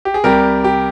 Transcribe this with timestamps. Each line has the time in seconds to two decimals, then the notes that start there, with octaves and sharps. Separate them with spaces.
0.05 G4
0.14 G#4
0.24 C2 C3 G3 G4 A#4
0.64 G4